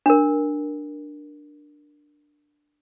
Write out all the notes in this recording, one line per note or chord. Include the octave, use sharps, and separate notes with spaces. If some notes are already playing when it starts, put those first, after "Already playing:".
D4 A#4